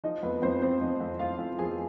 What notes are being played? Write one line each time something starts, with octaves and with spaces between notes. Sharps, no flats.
F3 D#4 D#5
F2 B3 B4
F2 C4 C5
F3 C4 C5
F2 D#4 D#5
F2
F2 F4 F5
F2
F3 G#4 G#5